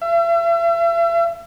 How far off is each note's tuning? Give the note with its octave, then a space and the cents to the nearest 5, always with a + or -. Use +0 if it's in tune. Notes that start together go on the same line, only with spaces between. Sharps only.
E5 +40